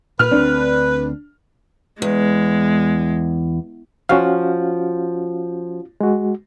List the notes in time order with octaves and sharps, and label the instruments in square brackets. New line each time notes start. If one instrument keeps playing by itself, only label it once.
[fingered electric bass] A#2 [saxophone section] B4 [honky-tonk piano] F6
[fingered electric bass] D2 A#3 C4 [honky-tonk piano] D4
[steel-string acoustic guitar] E2 [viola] G#3
[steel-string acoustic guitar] F3 [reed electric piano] C#4 F#4 F5
[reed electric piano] G#3 F#4